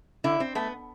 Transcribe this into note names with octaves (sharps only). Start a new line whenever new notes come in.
D3 E4
C4
A3 B3